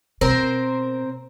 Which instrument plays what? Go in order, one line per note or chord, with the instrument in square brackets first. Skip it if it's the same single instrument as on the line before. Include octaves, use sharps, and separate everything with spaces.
[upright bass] B2 [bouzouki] C4 A#4 C5